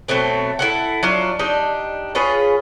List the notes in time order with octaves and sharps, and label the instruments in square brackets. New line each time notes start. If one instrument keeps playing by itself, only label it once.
[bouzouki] B2 F#3 A3 C4
E4 A4 F#5
F#3 D4 F4
D4 D#4 G4
C#4 F4 G#4 B4